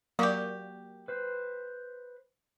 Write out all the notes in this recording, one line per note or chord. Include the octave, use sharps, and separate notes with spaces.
F#3 A#3 F#4 G4 D5 D6
B4 C5